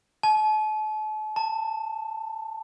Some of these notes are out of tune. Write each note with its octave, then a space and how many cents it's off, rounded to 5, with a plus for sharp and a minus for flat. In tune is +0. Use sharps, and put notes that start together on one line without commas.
A5 -40
A5 +25